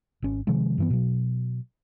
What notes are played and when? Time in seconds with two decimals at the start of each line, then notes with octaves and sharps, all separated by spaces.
0.22 G#1 C#4
0.47 C3 D#3 F3 G#3
0.78 G2 E3 B3
0.90 B2 F#3